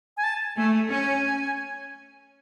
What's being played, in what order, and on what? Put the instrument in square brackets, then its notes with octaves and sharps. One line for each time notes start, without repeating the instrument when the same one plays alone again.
[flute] G#5
A5
[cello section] A3 [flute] G#5
[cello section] C#4 [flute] G#5